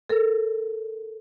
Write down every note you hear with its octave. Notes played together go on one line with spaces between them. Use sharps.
A4 A#4